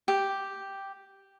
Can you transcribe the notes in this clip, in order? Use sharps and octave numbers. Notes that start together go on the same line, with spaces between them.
G4